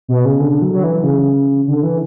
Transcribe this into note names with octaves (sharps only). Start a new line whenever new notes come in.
B2
C#3
D3
F#3
F#3
E3
C#3
D3
E3